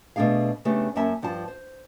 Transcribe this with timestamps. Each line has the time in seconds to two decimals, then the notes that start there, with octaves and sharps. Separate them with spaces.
0.16 B2 A3 D4 G#4 F5
0.65 C#3 A3 B3 D4 G4
0.96 F#2 A#3 C#4 E5 A5
1.22 G2 F3 F4 A5
1.48 C5